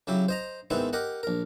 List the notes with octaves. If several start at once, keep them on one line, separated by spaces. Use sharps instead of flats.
C#3 F#3 E4 G4
C5 D#5 A#5
G#2 D#3 G#3 B3 C4 E4
G4 A#4 D#5 F#5
A#1 A#4